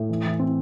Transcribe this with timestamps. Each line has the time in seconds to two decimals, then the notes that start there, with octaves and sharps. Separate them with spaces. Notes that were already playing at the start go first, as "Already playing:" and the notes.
Already playing: A2
0.09 E3
0.25 E3
0.39 C4